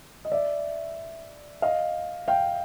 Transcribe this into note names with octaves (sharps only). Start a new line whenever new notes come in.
D#5
D5 E5
D#5 F5
F5 G5